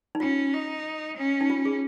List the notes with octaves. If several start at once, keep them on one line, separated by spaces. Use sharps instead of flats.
D#4
C#4 F4
D#4
C#4
D#4
F4
G#4